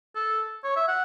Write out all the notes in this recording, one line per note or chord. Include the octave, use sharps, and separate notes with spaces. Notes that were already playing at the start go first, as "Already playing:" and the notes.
A4
C#5
E5
F#5